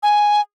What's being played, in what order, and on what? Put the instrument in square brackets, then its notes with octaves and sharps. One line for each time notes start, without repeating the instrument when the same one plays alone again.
[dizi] G#5